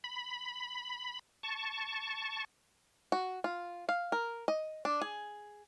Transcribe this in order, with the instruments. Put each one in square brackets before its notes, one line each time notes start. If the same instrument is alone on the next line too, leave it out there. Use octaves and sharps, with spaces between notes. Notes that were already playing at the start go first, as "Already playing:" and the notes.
[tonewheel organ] B5
A5 C#6
[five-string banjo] F#4
F4
F5
A#4
D#5
D4
G#4